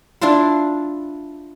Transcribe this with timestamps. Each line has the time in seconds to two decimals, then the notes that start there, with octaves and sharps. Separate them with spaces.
0.21 D4 E4 F4 C6